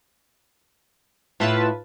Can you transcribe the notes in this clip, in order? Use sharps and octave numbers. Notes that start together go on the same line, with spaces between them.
A2 E4 F4 B4 E5 A5